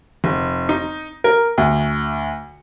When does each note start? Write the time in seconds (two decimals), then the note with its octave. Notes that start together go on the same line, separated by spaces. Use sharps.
0.24 F1
0.69 D#4
1.24 A#4
1.58 D2